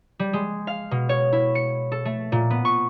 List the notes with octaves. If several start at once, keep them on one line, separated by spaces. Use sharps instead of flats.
G3
G#3
F5
B2
C#5
E4
C#7
A4
A3
A#2
B3
C#6